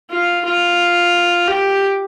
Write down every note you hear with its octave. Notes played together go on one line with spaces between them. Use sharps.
F4
F4
G4